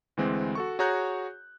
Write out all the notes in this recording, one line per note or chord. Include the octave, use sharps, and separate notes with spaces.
D2 E3 G#3 C4
F#4 A4 C#6
F#4 G#4 C#5 A#5 F#6 G6